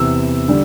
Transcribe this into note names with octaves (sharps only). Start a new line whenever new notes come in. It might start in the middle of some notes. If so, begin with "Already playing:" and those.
Already playing: E2 C3 E3 B3 E6
D3 G3 D4